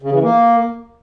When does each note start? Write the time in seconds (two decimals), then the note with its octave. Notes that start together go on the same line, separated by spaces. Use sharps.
0.02 C#3
0.12 E3
0.23 A#3